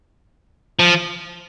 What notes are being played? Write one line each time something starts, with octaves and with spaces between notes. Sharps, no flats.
F3